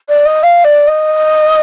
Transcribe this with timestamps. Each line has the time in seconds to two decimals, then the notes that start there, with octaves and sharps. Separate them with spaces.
0.09 D5
0.25 D#5
0.43 F5
0.64 D5
0.87 D#5